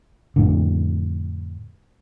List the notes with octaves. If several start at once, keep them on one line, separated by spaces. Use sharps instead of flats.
F2 A2 D3